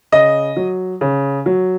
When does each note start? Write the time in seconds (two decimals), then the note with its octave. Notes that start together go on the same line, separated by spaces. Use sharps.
0.12 C#3 D#5
0.56 F#3
1.01 C#3
1.46 F#3